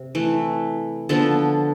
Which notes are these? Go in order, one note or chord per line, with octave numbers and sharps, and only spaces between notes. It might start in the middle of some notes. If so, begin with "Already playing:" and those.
Already playing: C3
E3 A3
D3 F3 B3 A4